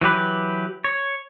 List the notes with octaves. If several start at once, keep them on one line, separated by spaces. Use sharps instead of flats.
E3 F#3 G4 B4
C#5